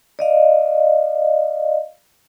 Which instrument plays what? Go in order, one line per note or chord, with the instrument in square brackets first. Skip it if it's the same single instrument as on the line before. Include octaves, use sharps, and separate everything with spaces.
[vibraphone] D5 D#5 F5